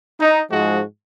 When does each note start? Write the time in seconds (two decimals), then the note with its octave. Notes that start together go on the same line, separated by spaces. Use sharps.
0.20 D#4
0.50 G#2 F3 G#3 F#4